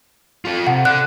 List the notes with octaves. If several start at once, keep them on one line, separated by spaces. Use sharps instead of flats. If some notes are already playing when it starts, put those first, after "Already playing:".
F4 A4
C3 F#5
A4 D5 F#6